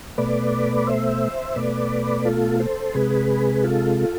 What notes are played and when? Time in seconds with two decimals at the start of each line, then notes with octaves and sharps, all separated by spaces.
0.18 B2 A3 B4 D5
0.87 C5 E5
1.56 B2 A3 B4 D5
2.25 F4 A4
2.60 A4 C5
2.94 C3 G#3 G#4 B4
3.63 F4 A4